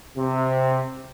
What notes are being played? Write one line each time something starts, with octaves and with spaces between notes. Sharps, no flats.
C3